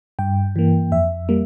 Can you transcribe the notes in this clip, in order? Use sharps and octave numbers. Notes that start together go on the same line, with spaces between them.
G2 G5
E3 A#3
F2 E5
G3 A#3